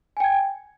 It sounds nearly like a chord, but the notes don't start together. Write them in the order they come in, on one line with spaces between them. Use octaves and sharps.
G#5 G5 G#6